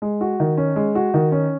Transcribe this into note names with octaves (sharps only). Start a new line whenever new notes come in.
G#3
F#4
D#3
C#4
G#3
F#4
D#3
C#4